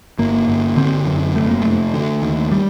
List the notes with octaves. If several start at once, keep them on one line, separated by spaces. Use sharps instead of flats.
G1 A#3
G1
D3 C4
F#2
F1 A3
A#3
F1 A3
D3
D#2
G3